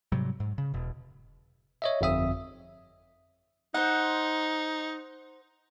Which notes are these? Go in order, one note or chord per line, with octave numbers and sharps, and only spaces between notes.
G#2 C3 F#3 G3
G#2
C#3
E1 B2
C#5 D#5 E5
G1 F2 E5 D#6
D#4 C5 F#5